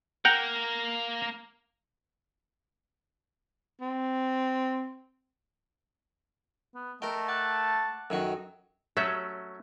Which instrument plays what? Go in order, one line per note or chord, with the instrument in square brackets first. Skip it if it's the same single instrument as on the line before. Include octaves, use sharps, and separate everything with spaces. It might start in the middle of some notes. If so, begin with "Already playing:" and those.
[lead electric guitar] A#3 A#4 [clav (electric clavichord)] F#5 G5 A#5
[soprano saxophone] C4
[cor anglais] B3
[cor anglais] A3 [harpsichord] A#4 G5 [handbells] D#5
[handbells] F#5 D6 F#6 [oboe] A5
[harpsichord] F#2 D#3 F#4 [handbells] A4
[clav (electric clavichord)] F#3 A3 C#4 [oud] E5